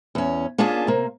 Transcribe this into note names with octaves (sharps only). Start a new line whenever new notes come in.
E2 C#4
A#3 C#4 D4 F4 G#4 A5
C3 A#3